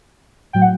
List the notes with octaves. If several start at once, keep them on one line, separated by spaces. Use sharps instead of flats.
A2 F#3 G5
F#5